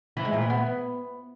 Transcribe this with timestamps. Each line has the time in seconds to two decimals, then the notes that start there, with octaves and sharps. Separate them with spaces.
0.17 E3
0.25 G#3
0.33 A#2
0.42 E3
0.50 B3